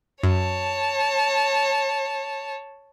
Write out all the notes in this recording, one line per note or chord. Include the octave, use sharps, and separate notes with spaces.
F#2 C#5 A5